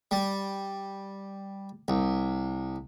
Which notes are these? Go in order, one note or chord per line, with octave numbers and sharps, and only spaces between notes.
G3
C2